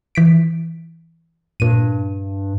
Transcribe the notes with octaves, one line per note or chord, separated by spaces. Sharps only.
E3 B6 D7
G2 A#2 D#7